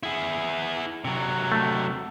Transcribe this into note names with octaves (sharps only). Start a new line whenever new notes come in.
E4 G#4
C3 F#3
A3